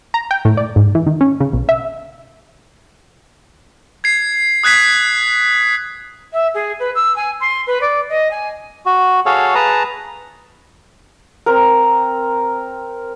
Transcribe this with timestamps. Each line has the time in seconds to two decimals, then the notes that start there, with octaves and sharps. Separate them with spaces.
0.14 A#5
0.31 G5
0.45 A2
0.57 D5
0.76 G#2
0.95 E3
1.06 D#3
1.21 C#4
1.40 C#3
1.53 B1
1.69 E5
4.04 G#6 C7
4.63 D#6 F#6 G#6 B6 C7
6.33 E5
6.55 G#4
6.80 B4
6.95 E6
7.16 G#5
7.41 C6
7.67 B4
7.81 D5
8.09 D#5
8.31 G#5
8.86 F#4
9.26 F#4 G#4 A4 C#5 F5
9.55 G#4 B4 A5 A#5
11.46 C4 A#4